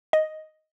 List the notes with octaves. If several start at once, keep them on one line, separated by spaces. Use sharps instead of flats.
D#5